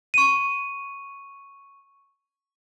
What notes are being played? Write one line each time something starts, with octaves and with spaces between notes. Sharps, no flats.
C#6 D#7